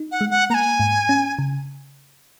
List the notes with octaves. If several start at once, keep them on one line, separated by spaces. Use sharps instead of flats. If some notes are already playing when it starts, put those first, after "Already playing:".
Already playing: D#4
F#5
G#3
F#5
A#3 G#5 A#5
G#2
C#4
C#3